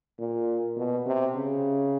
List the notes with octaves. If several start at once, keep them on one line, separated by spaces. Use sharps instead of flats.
A#2
B2
C3
C#3